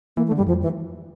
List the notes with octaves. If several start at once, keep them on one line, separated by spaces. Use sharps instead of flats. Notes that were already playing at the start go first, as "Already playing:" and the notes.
E3 A#3
A3
D3
G3
G2
F2 F3
E3